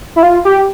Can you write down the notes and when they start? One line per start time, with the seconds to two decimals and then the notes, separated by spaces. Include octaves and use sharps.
0.16 E4
0.23 F4
0.45 G4